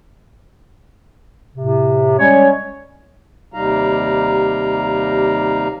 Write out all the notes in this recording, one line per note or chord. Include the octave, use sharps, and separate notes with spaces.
A2 C3
G3 G#3 C#4 C#5
D#2 C3 G3 D#4 F5 A#5